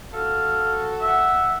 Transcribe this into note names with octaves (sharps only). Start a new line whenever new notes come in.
F#4 A4 F5
E5 F#5 E6